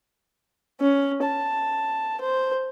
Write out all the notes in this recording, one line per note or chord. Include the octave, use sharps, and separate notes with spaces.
C#4
A5
C5